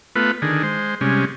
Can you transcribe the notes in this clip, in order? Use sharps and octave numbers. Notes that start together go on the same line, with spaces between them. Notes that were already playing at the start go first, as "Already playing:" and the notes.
A3 B3 F4 B4
D3 D#3 G#4
G#3 C5
C3 G3 G#3 C#4